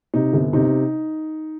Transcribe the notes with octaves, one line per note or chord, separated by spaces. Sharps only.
C3 D#4
G1
C3 D#4